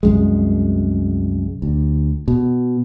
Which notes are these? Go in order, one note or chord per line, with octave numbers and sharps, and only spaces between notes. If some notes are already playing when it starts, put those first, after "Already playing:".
C2 F#2 G#3
D2
B2